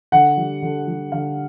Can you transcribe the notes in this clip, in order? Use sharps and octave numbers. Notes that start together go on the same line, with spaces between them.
D3 F#5
G3
D3
G3
D3 F5